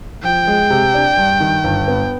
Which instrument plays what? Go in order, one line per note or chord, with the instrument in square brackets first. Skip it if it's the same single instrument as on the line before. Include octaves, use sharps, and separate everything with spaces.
[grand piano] F3 [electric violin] G5
[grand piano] G#3
C3
D4
G2
D#3
G1
B3